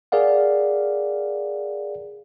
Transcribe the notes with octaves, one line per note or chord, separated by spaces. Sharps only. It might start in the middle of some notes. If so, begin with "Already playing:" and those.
G#4 A#4 D5 F5 F#5